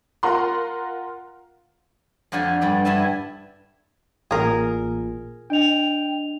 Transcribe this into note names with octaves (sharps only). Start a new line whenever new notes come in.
F4 A#4 F#5 A#5 C6
F2 D3 F4 G4 G#5
G2 G3 D5
G2 E4 E5 G#5 A5
A1 A#2 G#4 A#4
D4 D#5 G5 F7